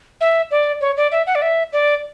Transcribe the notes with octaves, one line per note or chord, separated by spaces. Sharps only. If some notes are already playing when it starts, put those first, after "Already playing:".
E5
D5
C#5
D5
E5
F#5
D5
E5
D5